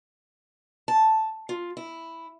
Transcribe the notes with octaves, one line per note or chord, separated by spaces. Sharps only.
A5
F4
E4